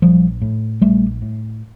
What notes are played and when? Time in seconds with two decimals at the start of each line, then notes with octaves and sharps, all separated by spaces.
0.02 A#1 F3 G3
0.42 A2
0.81 A#1 G3 A3
1.22 A2